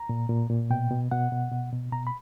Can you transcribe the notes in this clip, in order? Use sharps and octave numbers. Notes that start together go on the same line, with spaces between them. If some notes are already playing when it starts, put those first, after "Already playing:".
Already playing: A#5
A#2
A#2
A#2
B2 G5
B2
B2 F#5
B2
B2
B2
B2 A#5
B5